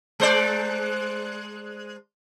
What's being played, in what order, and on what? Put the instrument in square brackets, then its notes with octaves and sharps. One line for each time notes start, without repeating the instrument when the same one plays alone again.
[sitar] G#3 C5 D5